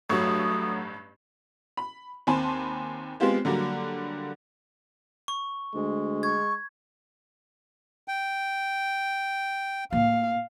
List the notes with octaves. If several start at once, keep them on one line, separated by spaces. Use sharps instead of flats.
A1 G2 F#3 A3 C#6 D#6
B5
D#2 C4 G#5 A5 B5 C6
G#3 B3 C4 F4 G4 C5
D3 F#3 G3 A#3
C#6
D2 G#3
C#6 G#6
G5
A2 A#3 F5